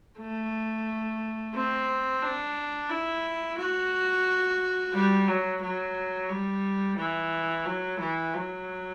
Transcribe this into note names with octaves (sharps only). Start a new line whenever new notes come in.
A3
C4
D4
E4
F#4
G3
F#3
F#3
G3
E3
F#3
E3
F#3